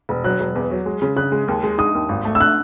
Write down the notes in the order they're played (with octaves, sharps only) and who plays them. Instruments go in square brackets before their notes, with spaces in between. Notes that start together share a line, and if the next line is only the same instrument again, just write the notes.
[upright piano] E1
[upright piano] F#3 [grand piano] F#6
[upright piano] E1
E2
F#3
G#3
C#3
[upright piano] C#3 [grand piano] F#6
[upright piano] G#3
D#2
G#3
[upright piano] D#4 [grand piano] D#6
[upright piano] D#2
G#1
A3
[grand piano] E6
F#6